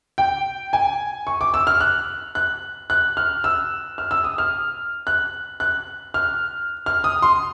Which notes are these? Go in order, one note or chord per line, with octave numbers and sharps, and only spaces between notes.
G5
G#5
C#6
D6
E6
F6
F#6
F#6
F#6
F6
E6
F6
E6
D#6
F6
F#6
F#6
F6
F6
D#6
C6